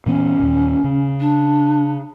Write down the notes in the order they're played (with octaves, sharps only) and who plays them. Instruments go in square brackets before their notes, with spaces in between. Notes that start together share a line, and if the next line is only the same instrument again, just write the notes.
[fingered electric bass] A#2 E3 B3 [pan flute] C#4
[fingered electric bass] D#2 A#2
C#3
[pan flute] D4